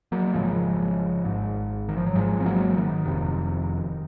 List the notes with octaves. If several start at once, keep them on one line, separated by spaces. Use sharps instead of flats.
F#3 A#3
G#1 F#2 C#3 F3 G#3
G#1 G#2
D#3
F3
F#3
G#1 G#2 F3 G#3
C4
F#3 A#3
F3
D#3
F1 F2 C3